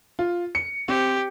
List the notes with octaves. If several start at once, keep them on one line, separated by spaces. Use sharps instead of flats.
F4
C#7
C4 G4